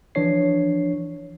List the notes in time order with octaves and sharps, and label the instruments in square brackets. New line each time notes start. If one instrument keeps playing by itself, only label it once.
[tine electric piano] E3 F3 D4 C#5 C7